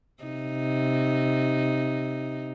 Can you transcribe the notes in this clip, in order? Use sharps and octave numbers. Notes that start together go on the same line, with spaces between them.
C3 D#4